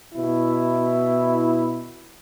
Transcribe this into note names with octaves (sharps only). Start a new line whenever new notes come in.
B2 E4